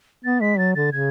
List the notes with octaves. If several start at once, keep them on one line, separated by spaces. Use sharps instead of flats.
B3 A6
G#3 B6
F#3 A6
D3 A6
C#3 G#6